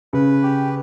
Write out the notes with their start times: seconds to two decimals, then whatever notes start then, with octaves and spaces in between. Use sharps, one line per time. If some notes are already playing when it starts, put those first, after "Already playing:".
0.13 C#3 B4
0.43 G4